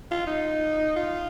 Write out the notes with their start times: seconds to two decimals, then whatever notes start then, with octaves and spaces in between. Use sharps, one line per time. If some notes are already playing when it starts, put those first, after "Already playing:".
0.11 F4
0.27 D#4
0.96 F4